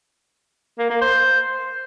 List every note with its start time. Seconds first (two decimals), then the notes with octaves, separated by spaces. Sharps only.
0.79 A#3
0.90 A#3
1.01 C5